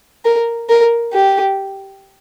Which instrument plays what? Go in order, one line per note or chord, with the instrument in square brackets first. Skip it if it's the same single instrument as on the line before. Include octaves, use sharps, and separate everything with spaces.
[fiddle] A#4
A#4
G4